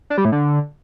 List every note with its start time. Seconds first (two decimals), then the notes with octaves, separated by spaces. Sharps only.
0.10 D4
0.18 G3
0.25 A2
0.32 D3